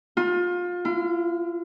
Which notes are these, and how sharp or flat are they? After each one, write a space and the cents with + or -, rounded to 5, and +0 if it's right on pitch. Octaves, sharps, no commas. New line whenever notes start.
F4 +25
F4 -45